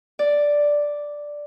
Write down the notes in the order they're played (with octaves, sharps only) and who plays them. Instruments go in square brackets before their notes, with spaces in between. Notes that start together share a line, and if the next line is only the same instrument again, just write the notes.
[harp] D5